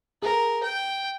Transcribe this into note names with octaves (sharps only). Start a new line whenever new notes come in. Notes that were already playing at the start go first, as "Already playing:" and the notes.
G#4 A#4
G5